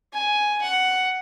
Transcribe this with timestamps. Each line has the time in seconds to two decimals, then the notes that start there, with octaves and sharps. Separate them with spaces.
0.13 G#5
0.62 F#5